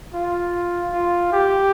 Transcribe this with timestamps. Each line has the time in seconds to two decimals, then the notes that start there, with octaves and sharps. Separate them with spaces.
0.14 F4
0.92 F4
1.32 G4